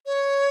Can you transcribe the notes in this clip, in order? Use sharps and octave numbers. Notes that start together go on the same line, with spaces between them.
C#5